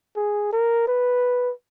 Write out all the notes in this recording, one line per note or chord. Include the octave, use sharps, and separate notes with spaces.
G#4
A#4
B4